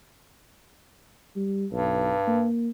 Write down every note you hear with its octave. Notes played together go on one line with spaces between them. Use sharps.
G3
B1 G2
A#3